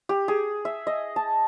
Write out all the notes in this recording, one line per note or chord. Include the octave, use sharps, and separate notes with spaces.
G4
G#4
E5
D#5
A5